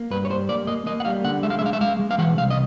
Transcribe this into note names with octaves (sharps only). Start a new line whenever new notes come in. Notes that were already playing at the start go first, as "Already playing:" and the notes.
Already playing: A#3
G2 B4
C#5
G3 C5
A#3 D5
A#3 D#5
A#3 D#5
F#5
G3 F5
D3 F#5
G#3 E5
F5
E5
G#3 F5
E5
G#3 F5
G#3
F5
E3 F#5
C2 F5
D#5